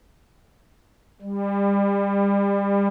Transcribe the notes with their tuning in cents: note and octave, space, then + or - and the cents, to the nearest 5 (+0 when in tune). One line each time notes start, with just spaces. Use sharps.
G3 +25